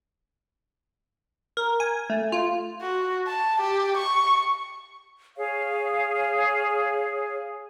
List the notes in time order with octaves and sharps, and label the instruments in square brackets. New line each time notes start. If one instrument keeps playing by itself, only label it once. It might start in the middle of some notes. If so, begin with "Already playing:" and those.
[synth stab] A#4
G#5
A3
F4
[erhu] F#4
A5
G4
C#6
[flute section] G#4 C#5 F5